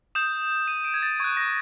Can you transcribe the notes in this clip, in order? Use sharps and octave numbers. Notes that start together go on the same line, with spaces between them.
D#6 G6 E7
D#7
D7
G#6
A6
C#6 F#6 G#6
A#6